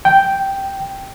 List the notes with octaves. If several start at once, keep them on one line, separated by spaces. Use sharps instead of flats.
G5